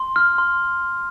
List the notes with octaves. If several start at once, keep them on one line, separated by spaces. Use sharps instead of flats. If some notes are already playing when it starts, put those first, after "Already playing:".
Already playing: C6
F6
C6